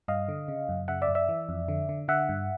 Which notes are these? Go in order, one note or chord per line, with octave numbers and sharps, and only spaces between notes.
G2 D#5 F5
D3
C#3
F#2
C#3 E5 F#5
D5 E5
F#2
D5 E5
E3
F2
D3
D3
D3 E5 F#5
G2